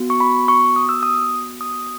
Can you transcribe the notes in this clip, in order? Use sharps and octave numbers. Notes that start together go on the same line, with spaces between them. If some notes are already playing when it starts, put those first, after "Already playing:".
Already playing: B3 F#4
C#6
B5
C#6
D#6
E6
D#6
D#6